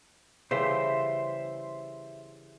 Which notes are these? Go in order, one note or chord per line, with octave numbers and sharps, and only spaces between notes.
C#3 E3 G3 C5 E5 C6